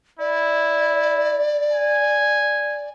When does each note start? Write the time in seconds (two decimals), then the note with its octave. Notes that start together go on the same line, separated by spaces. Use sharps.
0.19 E4 D5
1.72 G#5